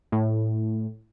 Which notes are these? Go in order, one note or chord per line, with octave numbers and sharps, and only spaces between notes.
A2